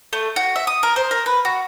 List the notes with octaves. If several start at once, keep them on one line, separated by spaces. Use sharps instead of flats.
A3
F#4
E5
D#6
A#4
C5
A#4
B4
F#4